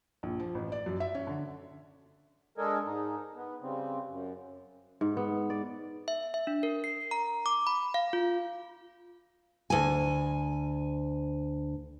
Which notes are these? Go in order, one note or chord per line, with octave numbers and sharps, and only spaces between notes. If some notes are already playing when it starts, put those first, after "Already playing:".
A#1
F3
A1
D5
F#2
E5
C#4
D3
G#3 D4 A4 A#4 D#5 G#5
G#2 D#4
B3
C#3 G3 C4
F#2
G#2
B3
D5
E5
E5
D4
A#4
C7
A#5
D6
B5
F5
F4
D2 G#5